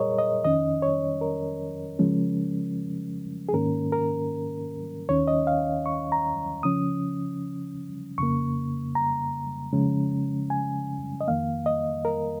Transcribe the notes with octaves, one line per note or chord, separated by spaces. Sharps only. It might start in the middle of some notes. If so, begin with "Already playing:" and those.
Already playing: A#2 G#4 A#4 C#5 D#5
D#5
F2 D#3 C#4 D#5
C#5
A#4
C#3 F3 G#3 C#4
G#4
G#2 D#3 A#3 C#4 A#4
A#4
D#2 D#3 C#4 C#5
D#5
F5
C#6
A#5
C#3 F3 C#4 D#6
F2 C#3 A#3 C#6
A#5
C#3 F3 G#3 C#4
G#5
D#5
F2 D#3 A#3 F5
D#5
A#4